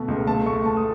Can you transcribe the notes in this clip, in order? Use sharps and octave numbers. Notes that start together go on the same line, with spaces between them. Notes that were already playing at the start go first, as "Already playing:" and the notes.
Already playing: B2 A3
C#2
A3 A5
A3 C#6
A3 A5
D#6